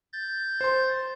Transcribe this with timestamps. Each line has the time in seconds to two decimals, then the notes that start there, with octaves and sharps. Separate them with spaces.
0.13 G6 A6
0.61 C5 C6